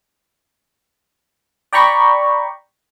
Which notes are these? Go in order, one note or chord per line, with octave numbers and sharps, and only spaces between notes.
D5 G5 A#5 B5 C#6